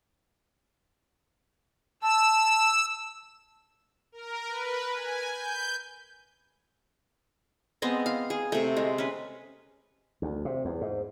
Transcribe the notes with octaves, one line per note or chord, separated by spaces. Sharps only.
A5 E6
A#4
B4
G#5
G6
G#3 B3 C4 D#5
F5
G#4
C3 A3
G#3
C#4 B4
D2
C3
E2
G#2